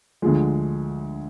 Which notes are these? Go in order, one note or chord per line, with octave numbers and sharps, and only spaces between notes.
D2 D3 F3 G#3